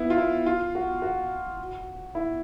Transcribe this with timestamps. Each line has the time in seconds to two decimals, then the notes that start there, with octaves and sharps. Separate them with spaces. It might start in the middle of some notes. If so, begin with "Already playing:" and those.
Already playing: B3 E4
0.10 F4
0.18 E4
0.46 F4
0.75 F#4
1.02 F#4
2.15 E4